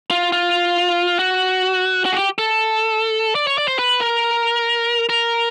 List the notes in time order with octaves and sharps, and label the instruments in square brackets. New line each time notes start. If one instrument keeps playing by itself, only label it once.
[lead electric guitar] F4
F4
F#4
F#4
G#4
G4
A4
D5
C#5
D5
C5
B4
A#4
A#4